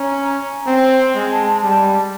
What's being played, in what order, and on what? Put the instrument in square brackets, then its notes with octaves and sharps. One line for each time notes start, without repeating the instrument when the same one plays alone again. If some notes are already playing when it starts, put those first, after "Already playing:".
Already playing: [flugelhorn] C#4 [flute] A#5
[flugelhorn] C4
G#3
[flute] A5
A5
[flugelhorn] G3 [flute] A5